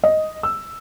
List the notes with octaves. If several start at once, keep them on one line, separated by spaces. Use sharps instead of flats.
D#5
E6